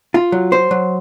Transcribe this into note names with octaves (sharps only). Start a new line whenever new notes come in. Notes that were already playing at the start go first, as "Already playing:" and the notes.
F4
F#3
C5
F#3